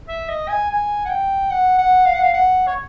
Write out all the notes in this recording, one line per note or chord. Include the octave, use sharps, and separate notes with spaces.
E5
D#5
G#5
G#5
F#5
G5
F#5
F#5
F5
F#5
F5
F#5
C#5